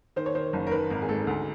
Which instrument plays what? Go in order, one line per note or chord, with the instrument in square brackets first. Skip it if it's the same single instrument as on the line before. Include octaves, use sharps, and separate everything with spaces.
[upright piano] D#3 C5
C#5
D#3 C5
F#1
A#4
D#3 B4
G#1 A#4
G#4
G#2 A4
D2